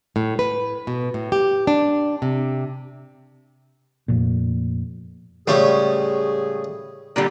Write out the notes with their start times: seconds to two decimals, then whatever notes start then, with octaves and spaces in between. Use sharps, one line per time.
0.16 A2
0.39 B4
0.87 B2
1.14 A2
1.32 G4
1.67 D4
2.22 C3
4.08 F1 F2 A#2
5.47 C#2 A2 G3 C#4 G#4
7.16 A#2 D3 G3 D5